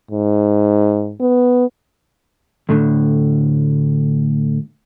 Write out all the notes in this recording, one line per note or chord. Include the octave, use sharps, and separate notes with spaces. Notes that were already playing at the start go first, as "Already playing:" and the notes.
G#2
B3
D2 A2 D3